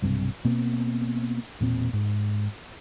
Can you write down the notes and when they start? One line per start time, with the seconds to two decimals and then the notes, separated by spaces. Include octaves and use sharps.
0.02 B1 G2 C3
0.45 B2 A#3 C4
1.61 E1 A#2 C4
1.93 G#2